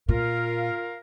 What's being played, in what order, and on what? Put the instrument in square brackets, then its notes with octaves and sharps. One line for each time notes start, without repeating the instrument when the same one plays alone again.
[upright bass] A#2 [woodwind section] F4 A#4 F5